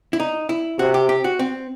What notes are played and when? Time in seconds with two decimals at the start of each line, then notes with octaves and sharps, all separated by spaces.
0.13 E4
0.20 D#4
0.49 E4
0.79 C3 F#4
0.94 G4
1.09 G4
1.24 F#4
1.39 C4